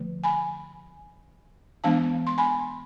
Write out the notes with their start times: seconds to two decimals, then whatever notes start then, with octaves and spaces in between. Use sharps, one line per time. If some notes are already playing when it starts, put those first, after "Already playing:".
Already playing: D3 F3 A3
0.24 G#5 B5
1.84 E3 G#3 B3 D4 F5 A5
2.27 C6
2.38 G#5 B5